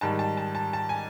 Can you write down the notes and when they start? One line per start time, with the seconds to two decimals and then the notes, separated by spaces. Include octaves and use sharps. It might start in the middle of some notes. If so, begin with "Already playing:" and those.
0.01 G#2 D#3 G3 A5
0.19 A5
0.37 A5
0.55 A5
0.73 A5
0.89 G#5